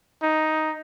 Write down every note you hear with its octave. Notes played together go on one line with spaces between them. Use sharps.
D#4